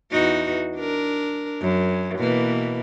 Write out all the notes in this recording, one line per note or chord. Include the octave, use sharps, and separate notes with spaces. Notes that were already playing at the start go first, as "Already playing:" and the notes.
E2 D#4 F#4
D4 A#4
F#2
B2 E3 A#3